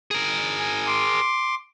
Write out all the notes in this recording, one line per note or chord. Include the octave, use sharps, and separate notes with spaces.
G#4 A#4
G#5
C6 D6